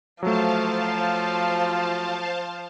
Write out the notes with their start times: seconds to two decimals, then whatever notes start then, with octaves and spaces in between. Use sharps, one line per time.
0.23 F3 F#3 A3 C5 F5 A5